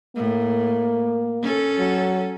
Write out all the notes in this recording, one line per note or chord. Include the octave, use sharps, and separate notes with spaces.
A2 A#3
C#4 A4
F#3